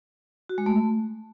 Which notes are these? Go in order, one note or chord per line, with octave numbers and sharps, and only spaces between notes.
F#4
G#3
A3